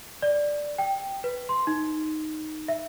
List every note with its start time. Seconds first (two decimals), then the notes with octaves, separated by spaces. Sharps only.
0.22 D5
0.78 G5
1.24 B4
1.49 C6
1.67 D#4
2.68 E5